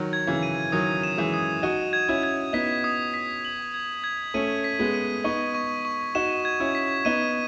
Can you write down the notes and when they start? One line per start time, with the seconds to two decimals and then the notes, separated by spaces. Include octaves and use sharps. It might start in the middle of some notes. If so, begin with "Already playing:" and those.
Already playing: D#3 F#3
0.13 G#6
0.27 C#3 E3
0.43 D#7
0.72 D#3 F#3 D#6
1.03 E7
1.18 E3 G#3
1.34 D#6
1.63 D#4 F#4 D#7
1.93 G#6
2.09 C#4 E4
2.23 G#6
2.53 B3 D#4 B6
2.84 D#6
3.14 B6
3.45 F#7
3.74 G#6
4.04 G#6
4.34 A3 C#4 D#7
4.64 B6
4.79 G#3 B3
4.94 D#7
5.24 B3 D#4 C#6
5.54 C#6
5.85 C#6
6.15 D#4 F#4 E7
6.45 G#6
6.60 C#4 E4
6.75 B6
7.05 B3 D#4 D#7